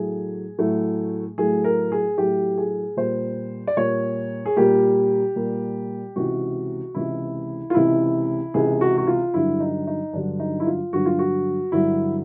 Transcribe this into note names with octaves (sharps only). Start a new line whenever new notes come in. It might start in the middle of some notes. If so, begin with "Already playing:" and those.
Already playing: A2 F#3 A3 G#4
A2 F#3 A3
A2 F#3 A3 G#4
A#4
G#4
A2 F#3 A3 G4
G#4
A#2 G3 A#3 C5
D5
A#2 G3 A#3 C#5
G#4
A#2 G3 A#3 G4
A#2 G3 A#3
C#2 C3 E3 F#4
C#2 C3 E3 E4
F4
C#2 C3 E3 E4
C#2 C3 E3 G#4
F#4
F#4
F4
G2 D3 F#3 E4
D#4
D#4
G2 D3 F#3 D4
D#4
E4
F4
G2 D3 F#3 F#4
F4
F#4
G2 D3 F#3 E4